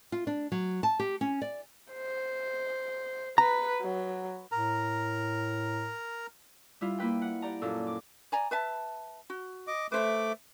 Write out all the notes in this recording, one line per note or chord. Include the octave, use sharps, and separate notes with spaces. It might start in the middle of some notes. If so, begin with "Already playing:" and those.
F4
D4
F#3
A5
G4
C#4
D5
C5
B4 A#5
F#3
A2 A#4 A#5
G3 E4 F4
A#3 E4 B4 G5
F#5
G4 D5 A#5
F#2 A#2 A4
D6
D5 G#5 A#5
B4 E5 A5
F#4
D#5 D6
A3 B4 C5 E5 D6